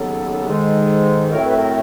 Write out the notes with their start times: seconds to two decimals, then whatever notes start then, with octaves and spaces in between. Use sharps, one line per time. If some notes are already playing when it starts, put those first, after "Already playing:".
Already playing: D#2 C#3 F#3 B3 A4
0.47 G#2 D#3 G#3
1.32 A2 F#3 A3 C4 A#4
1.44 B4
1.57 A#4